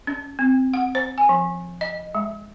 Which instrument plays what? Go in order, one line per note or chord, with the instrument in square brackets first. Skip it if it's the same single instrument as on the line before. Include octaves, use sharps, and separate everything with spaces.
[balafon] C#4
C4
F#5
C5
G#5
F3
D#5
G#3